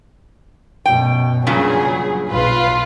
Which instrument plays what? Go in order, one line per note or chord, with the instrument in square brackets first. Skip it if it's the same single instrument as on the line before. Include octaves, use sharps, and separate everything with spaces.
[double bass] F#2 B2 [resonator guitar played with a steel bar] G5
[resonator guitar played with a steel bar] G2 A#2 C#3 [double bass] F#3 [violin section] G#4
[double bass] B1 [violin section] F4 B4